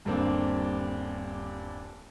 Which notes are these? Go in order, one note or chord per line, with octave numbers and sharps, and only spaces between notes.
D#1 G2 D3 A#3 C4 D4